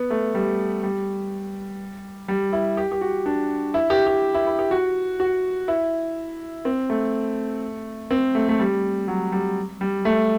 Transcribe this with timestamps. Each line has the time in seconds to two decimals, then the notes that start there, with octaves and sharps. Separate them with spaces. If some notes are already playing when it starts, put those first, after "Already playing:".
Already playing: B3
0.10 A3
0.35 G3
0.83 G3
2.28 G3
2.53 E4
2.77 G4
2.92 G4
3.01 F#4
3.26 D4
3.74 E4
3.90 G4
4.07 G4
4.34 E4
4.47 E4
4.59 G4
4.71 F#4
5.20 F#4
5.68 E4
6.65 C4
6.90 A3
8.11 C4
8.35 A3
8.49 A3
8.60 G3
9.08 F#3
9.32 G3
9.81 G3
10.05 A3